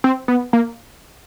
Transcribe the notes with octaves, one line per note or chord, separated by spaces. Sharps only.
C4
B3
A#3